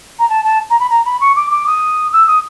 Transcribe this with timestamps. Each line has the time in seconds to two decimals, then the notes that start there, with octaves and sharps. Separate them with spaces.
0.19 A#5
0.29 A5
0.44 A5
0.70 A#5
0.80 B5
0.90 A#5
1.05 B5
1.21 C#6
1.36 D6
1.51 D6
1.67 D#6
2.13 E6
2.27 D#6